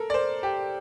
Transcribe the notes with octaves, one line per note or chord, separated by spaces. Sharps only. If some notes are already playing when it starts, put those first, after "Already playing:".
Already playing: A4 A#4
D5
C5
G4